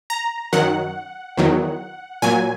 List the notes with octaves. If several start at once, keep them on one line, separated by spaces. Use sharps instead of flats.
A#5
F#2 D#3 F#3 F#5
E2 D#3 F#3
A#2 F#3 G#5